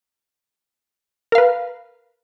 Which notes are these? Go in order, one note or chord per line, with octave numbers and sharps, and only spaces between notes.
A#4 B4 F5